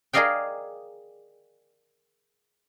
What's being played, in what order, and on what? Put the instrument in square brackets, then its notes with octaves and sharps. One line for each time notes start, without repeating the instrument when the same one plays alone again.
[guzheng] G#4 A#4 D5 D#5 F5 G5